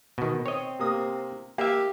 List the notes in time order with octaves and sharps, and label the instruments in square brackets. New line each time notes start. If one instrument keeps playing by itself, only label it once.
[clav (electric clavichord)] B2 D#3 [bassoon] F#4
[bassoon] C4 [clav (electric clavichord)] C#5 D#5
[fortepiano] C3 A#3 D#6
[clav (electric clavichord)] A#3 E5 [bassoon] G4 [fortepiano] F5